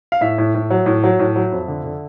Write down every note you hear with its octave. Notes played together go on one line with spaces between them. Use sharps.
F5
A2 E5
A2
A2
F#3
A2
F#3
A2
F#3
F2
D3
D3